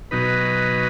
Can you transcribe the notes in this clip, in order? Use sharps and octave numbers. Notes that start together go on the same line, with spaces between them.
B2 F#3 D#4 B4